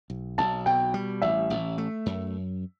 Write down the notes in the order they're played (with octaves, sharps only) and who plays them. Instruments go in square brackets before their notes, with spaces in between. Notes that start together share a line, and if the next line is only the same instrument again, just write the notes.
[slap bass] B1
[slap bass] B1 [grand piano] A5
[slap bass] B2 [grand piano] G5
[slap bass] G3
[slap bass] A1 [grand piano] E5
[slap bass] A1
A3
F#2